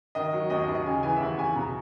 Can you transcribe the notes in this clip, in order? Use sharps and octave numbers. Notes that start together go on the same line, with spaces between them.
D#3 D#5
F#3
D#2 D#5
D#5
D#2
D#5
C#3 G#5
E3 G#5
E5
D#2 F#5
D#2 G#5
B2 A#5